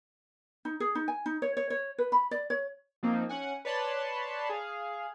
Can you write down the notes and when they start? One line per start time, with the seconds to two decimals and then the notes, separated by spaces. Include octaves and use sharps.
0.65 D#4
0.80 G#4
0.95 D#4
1.08 G#5
1.26 D#4
1.42 C#5
1.57 C#5
1.70 C#5
1.98 B4
2.12 B5
2.31 D5
2.50 C#5
3.03 F3 A#3 C4 D#4
3.29 C#4 F#5 G#5
3.65 B4 C#5 D5 A5 B5 C6
4.49 G#4 F5